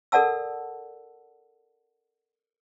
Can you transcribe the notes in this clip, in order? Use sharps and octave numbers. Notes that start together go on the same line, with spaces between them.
A4 A#4 D5 F#5 A5 E6